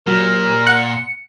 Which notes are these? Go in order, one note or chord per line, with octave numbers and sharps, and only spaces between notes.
A#2 F#3 A#4
F#5 F#6 C#7